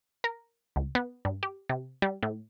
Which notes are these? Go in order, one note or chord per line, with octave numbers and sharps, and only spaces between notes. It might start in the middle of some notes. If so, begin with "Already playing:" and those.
A#4
C#2
B3
G2
G4
C3
G3
A2